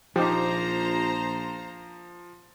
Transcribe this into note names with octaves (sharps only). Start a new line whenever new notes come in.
A#1 F3 D#4 G4 C5 A#5